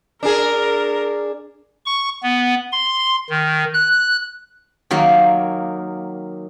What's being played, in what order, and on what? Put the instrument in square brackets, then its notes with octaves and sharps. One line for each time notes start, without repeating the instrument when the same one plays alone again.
[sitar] D4 G#4 [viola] A#4
[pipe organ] C#6
B3
C6
D#3
F#6
[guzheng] D#3 F#3 A#3